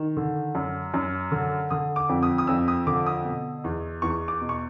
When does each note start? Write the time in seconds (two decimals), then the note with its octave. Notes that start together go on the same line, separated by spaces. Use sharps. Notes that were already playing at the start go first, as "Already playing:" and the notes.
Already playing: D#3
0.17 D3
0.55 F#2
0.94 F#2
1.32 D3
1.70 D3 D#6
1.96 D6
2.09 F2
2.23 D#6
2.38 D#6
2.47 F2 E6
2.68 D#6
2.87 D3 D6
3.06 D#6
3.25 B2
3.64 E2
4.02 E2 C#6
4.28 D6
4.41 B2
4.49 C#6